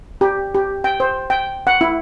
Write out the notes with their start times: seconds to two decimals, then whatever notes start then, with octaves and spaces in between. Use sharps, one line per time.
0.21 G4
0.54 G4
0.84 G5
1.00 C5
1.30 G5
1.67 F#5
1.81 E4